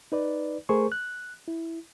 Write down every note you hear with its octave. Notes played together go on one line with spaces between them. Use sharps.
D#4 B4 D5
A3 G#4 A#4 C5 C#6
F#6
E4